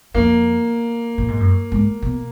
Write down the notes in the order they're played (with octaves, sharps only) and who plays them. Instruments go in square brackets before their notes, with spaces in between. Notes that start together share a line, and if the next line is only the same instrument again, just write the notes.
[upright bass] F2 [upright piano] A#3
[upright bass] A#2
G#2
F#2
G#2
B2